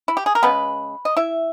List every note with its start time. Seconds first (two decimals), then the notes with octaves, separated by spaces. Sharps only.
0.08 E4
0.17 G4
0.26 G#4
0.35 A#4
0.43 C#3 G#3 B3 B4
1.05 D#5
1.17 E4 E5